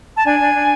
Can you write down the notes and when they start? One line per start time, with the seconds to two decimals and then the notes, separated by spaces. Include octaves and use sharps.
0.15 A5
0.26 D4 G#5
0.40 D4
0.55 D4